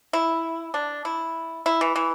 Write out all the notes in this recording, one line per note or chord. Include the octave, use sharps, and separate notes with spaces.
E4
D4
E4
E4
E3
E3